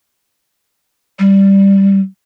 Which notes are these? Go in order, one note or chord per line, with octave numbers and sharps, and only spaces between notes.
G3